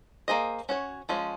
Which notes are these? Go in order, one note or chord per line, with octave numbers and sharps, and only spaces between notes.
A#3 F4 G#4 C5 D#5
C#4 F#4 C#5
F3 G#3 C#4